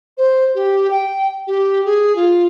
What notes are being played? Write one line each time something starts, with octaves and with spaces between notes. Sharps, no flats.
C5
G4
G5
G4
G#4
F4